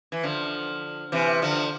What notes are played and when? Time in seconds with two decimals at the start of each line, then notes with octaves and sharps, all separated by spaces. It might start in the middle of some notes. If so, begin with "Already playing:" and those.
0.12 E3
0.23 D3 F3
1.12 C3 E3
1.42 D3 F3